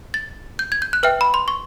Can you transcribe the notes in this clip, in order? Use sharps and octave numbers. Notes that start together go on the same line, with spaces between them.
A6
G6
G#6
G6
F#6
B4 E5 G5 F6
B5
C6
C#6